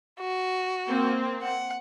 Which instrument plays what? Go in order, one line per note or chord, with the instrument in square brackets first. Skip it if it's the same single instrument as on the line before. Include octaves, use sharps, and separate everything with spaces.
[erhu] F#4
[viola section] A#3 C4
[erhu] F#5